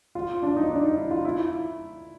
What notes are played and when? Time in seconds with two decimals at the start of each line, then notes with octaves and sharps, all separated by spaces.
0.15 F4
0.43 D4
0.56 D#4
0.70 D4
0.83 D#4
0.97 E4
1.11 F4
1.25 E4